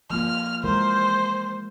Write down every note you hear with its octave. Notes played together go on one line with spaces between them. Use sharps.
F3 A#3 F4 F6
E3 G#3 A#4 C5